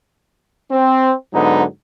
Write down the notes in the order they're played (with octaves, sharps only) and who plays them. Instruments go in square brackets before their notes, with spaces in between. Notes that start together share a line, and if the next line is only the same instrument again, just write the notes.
[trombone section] C4
G#2 D3 F#3 B3 D#4